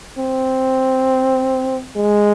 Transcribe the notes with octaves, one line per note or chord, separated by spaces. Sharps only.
C4
G#3